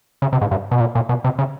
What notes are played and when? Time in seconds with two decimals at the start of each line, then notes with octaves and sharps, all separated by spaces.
0.22 C#3
0.33 C3
0.41 G#2
0.51 G2
0.71 B2
0.80 A#2
0.95 A#2
1.09 B2
1.24 C3
1.39 C#3